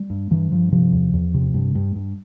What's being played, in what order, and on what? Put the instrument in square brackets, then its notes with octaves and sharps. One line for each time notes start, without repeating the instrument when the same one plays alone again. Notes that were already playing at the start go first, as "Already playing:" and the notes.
Already playing: [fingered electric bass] G3
G2
G2 E3
G2 F3
C3 F3
E2
E2
C3
G2
G2
G2